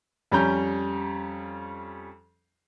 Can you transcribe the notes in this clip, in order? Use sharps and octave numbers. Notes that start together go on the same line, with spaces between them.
F2 G3 C#4 A#5 G6